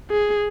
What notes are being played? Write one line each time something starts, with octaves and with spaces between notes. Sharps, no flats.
G#4